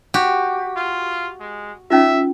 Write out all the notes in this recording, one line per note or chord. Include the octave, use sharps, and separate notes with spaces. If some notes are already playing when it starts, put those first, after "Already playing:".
F#4 G4
F4
G#3
C#4 D#4 F4 E5